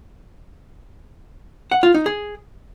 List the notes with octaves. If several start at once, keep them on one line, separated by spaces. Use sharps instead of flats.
F#5
F4
D#4
G#4